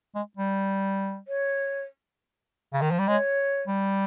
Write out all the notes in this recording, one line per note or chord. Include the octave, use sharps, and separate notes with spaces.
G#3
G3
C#5
C#3
D#3
F3
G3
G#3 C#5
G3